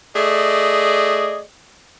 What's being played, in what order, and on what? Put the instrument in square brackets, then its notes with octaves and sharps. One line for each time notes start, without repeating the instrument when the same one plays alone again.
[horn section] A3 G#4 D5 D#5